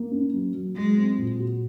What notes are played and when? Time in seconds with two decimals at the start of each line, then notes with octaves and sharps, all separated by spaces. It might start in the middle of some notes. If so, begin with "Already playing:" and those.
Already playing: A#3
0.11 C#4
0.33 F#3
0.54 F#3
0.76 F#3 G#3
0.97 C4
1.18 A#2
1.39 F#4